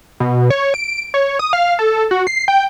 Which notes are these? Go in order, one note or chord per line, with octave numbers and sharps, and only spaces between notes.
B2
C#5
D7
C#5
D#6
F5
A4
F#4
C7
G5